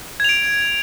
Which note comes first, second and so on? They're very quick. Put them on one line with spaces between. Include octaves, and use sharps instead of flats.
G#6 F7 D7